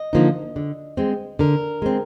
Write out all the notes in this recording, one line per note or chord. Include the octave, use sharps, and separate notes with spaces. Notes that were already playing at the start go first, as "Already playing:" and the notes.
Already playing: D#5
D3 F3 A#3 D#4
D3
G#3 C4
D3 A#4
G#3 C4